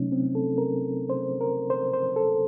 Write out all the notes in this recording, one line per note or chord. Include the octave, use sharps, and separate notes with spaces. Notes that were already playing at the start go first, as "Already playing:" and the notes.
Already playing: C3 F#3 A3 C#4 D#4
C4
A4
A#4
C5
A#4
C5
C5
A4